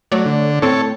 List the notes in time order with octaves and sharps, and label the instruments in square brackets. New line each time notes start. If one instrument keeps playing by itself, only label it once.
[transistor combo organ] F#3 [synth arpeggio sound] A3 C#5 D5
[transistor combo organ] D3
[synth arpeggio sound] A2 C4 [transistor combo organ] A4 C#5